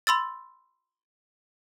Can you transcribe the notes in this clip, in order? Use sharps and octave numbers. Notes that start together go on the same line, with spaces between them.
B5 C6 E6 A6